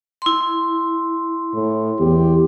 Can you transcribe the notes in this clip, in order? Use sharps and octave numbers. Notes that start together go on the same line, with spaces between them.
E4 C6
A2
E2 G4